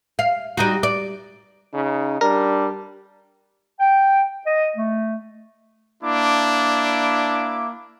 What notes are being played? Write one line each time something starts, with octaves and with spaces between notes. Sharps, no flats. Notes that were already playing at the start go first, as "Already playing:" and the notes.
F5
G3 D#4 F#4
D5
C#3 D#4
G3 D4 A#4
G5
D#5
A3
A#3 D4 E4 D6